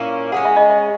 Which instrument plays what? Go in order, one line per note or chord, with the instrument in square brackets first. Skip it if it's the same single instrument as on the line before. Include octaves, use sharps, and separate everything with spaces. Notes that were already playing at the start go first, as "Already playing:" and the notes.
Already playing: [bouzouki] A#2 A#3 C#4 E4
[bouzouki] G#3 C#4 G#4 [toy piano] F#5
[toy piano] E5
D#5
E5